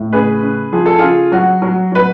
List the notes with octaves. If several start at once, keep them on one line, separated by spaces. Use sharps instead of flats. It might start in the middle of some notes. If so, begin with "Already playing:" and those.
Already playing: A2
C#3 G#4 B4
C#3
F3 G#4
A4
C#3 F4 G#4
F#3 F#4
F#3
F#3 B4